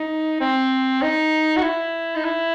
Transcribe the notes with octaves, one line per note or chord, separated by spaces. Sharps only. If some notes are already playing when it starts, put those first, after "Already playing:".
Already playing: D#4
C4
D#4
F#4
E4
D#4
E4